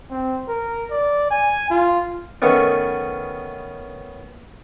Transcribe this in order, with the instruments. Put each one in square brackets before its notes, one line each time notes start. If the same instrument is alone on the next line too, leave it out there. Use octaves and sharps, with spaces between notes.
[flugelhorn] C4
A#4
D5
G#5
F4
[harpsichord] D#3 A3 B3 C#4